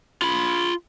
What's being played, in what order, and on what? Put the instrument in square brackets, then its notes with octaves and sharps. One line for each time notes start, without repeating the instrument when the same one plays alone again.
[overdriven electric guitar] F4 B5